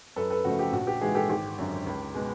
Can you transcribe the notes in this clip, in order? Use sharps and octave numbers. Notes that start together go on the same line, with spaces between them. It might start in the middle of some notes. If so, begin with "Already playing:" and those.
F#2 A4 B4
A4 B4
C#3 F3 A3 F#4
G4
A#1 F#4
G4
G#2 E3 G#3 F#4 G#4
G4 A4
G#1 G4
F#2 D3
C#2
B2 G#3